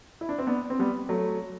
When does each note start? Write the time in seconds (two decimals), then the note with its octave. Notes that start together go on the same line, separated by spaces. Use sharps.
0.21 E4
0.29 D4
0.39 C4
0.47 B3 D4
0.70 C4
0.79 G3 B3
1.09 F#3 A3